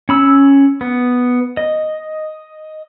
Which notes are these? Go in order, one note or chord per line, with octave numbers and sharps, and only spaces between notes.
C#4 B5 E6
B3
D#5